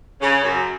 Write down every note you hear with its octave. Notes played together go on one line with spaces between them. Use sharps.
C#3
F#2